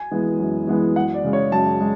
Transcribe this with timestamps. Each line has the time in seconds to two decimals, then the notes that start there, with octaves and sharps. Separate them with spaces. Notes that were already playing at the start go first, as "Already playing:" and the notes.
Already playing: G#5
0.11 E3 G#3 B3
0.39 F#2
0.67 E3 G#3 B3
0.96 F#2 F#5
1.14 D5
1.24 C#3 G#3
1.33 C#5
1.52 F#2 A5
1.80 G#3